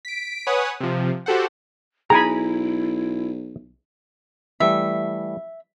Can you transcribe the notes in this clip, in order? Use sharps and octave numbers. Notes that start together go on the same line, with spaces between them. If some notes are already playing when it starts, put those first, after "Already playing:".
B6 D7
B4 C#5 F#5 G#5 D#6
C3 F3
F#4 G4 A4 C5 F#5
B1 E4 G#4 G#5 A#5 B5
E3 G3 A3 E5